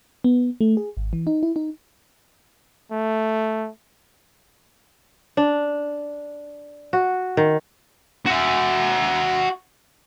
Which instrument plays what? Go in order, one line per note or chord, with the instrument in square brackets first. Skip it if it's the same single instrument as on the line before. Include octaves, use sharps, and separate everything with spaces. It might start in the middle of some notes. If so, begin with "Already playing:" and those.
[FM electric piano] B3
A3
G#4
G#1
E3
D#4
E4
D#4
[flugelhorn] A3
[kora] D4
F#4
D#3
[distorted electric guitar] F#4 E5